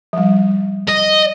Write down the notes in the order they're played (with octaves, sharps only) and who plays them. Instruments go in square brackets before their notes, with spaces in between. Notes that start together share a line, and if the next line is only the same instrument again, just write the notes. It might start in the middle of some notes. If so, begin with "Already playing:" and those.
[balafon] F3 G3
[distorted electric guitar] D#5